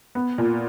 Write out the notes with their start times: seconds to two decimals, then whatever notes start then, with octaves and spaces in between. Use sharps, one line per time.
0.15 B3
0.38 A#2